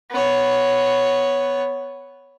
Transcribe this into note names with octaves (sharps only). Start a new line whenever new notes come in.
B3 C#5